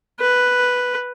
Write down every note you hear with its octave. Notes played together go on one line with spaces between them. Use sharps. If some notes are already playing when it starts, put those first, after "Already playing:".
B4